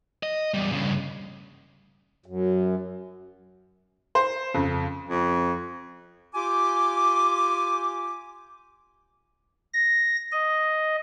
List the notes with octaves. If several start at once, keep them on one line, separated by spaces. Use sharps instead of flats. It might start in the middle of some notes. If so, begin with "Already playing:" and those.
D#5
E2 G3
G2 C#3
F#2
C5
F2 C#3
F2
F4 G4 G#5 D6
A#6
D#5